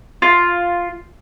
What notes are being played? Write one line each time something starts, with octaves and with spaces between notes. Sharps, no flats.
F4